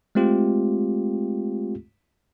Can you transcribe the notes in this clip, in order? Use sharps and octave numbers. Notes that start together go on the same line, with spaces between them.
G#3 A3 C4 F4 G4